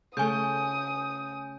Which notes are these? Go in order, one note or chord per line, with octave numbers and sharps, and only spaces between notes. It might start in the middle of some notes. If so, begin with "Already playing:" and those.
C#3 A3 G#5 D#6 G6